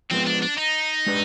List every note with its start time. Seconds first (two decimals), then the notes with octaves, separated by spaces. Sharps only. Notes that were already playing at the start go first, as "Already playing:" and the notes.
0.10 F3 G#3 B3 C4
0.27 D4
0.42 D4
0.58 D#4
1.06 G#3 D4 G4 B4 D5